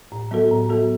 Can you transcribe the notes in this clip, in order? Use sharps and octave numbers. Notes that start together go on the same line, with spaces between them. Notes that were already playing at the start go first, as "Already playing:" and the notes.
A2
F#3 B3 F#4 A4
A2
F#3 B3 F#4 A4